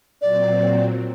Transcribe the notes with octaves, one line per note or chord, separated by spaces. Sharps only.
A#2 F#3 C4 D5